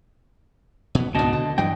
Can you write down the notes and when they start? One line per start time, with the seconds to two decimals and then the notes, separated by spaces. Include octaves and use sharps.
0.95 B2 B3
1.15 C#2 G#2 B2 D4 D#5 A5
1.33 D3
1.58 G2 E3 F#3 D#5 G5